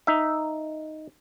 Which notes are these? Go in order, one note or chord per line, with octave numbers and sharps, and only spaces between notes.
D#4 E5